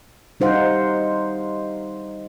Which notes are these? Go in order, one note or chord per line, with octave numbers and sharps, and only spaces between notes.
G3 D#4 C5 F5 F#5